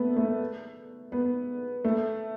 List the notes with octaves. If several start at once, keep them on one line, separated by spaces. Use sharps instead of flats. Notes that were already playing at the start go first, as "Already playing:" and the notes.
Already playing: A3 B3
A3
B3
A3